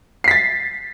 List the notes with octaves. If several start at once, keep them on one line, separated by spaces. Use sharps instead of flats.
A6 B6 C7